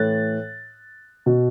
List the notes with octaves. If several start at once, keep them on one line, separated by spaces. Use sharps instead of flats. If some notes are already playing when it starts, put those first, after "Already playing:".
Already playing: A2 E3 F#6 A6
B2